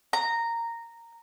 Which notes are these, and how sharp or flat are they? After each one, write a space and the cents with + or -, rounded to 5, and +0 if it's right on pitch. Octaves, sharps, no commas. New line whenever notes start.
A#5 -10